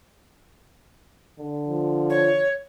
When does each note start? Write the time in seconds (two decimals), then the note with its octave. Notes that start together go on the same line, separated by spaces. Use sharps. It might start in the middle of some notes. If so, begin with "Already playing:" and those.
1.38 D3
1.68 F3
2.10 C#5